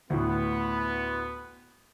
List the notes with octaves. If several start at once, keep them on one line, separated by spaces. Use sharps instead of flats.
D2 A2 B3